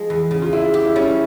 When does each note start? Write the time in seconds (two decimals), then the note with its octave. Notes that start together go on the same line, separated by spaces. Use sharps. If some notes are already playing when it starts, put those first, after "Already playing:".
Already playing: F3 G#3
0.10 E2
0.31 C#3
0.42 F4
0.53 C4 E4
0.74 G4
0.86 E4
0.95 G3 C#4